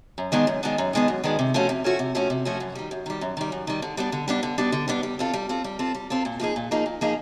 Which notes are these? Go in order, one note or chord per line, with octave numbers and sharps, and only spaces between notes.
F#2
D#3 G#3 B3 D4
F#2
D#3 G#3 B3 D4
F#2
D#3 G#3 B3 D4
F#2
D#3 G#3 B3 D4
C3
F3 A3 C#4 F#4
C3
F3 A3 C#4 F#4
C3
F3 A3 C#4 F#4
C3
F3 A3 C#4 F#4
F#2
D#3 G3
F#2
D#3 G3
F#2
D#3 G3
F#2
D#3 G3
D3
G3 B3 D4
D3
G3 B3 D4
D3
G3 B3 D4
D3
G3 B3 D4
G3
C4 F4 A4
G3
C4 F4 A4
G3
C4 F4 A4
G3
C4 F4 A4
A#2
F3 A#3 D#4 G#4
A#2
F3 A#3 D#4 G#4
A#2
F3 A#3 D#4 G#4